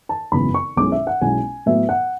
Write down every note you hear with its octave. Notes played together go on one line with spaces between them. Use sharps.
A5
G#1 F#2 C#3 E3 B3 B5
C#6
B1 B2 G#3 C#4 E4 D6
E5
F#5
B1 B2 G#3 C#4 E4 G#5
A2 F#3 B3 E5
F#5